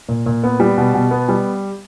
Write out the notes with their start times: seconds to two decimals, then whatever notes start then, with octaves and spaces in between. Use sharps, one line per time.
0.09 A#2
0.26 A#2
0.43 B3
0.60 G3
0.78 B2
0.94 B2
1.11 B3
1.29 G3